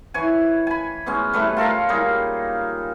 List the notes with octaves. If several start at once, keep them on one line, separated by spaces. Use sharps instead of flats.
E3 C#5 G#5
G#5 B5
B2 G#3 C#4
G3 A3 B4 E5
F4 A4 A#4 F5
G3 A#3 D#4 G#4